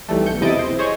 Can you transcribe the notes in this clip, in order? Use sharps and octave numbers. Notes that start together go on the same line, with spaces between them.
B1 E3 G3 A3
B1 G6 C#7
E2 C3 E4 D#5 A6 D7
C5
G#4 C5 C#5 D#5